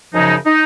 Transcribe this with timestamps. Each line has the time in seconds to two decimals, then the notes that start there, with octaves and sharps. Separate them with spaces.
0.13 F#2 C#3 F3 G#3 D#4
0.46 D#4